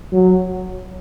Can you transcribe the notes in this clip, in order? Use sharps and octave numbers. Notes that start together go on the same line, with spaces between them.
F#3